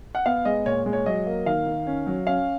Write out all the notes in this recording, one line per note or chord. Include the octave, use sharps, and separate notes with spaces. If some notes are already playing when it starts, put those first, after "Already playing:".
F#5
B3 F5
G#3 D#5
A#2 C#5
G#3
C#5
F#3 D#5
A#3
D#3 F5
D#3
C#4
F#3
C#4 F5